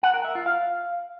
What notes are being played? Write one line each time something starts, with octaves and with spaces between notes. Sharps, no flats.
F#5
A#4
E5
F4
F5